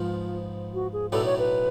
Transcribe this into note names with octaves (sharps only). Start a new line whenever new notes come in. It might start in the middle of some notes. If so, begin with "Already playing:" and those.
Already playing: G#2 F3 G#3 B3 F4
F#4
G#4
B1 A2 F#3 B3 D4 A4
C#5
B4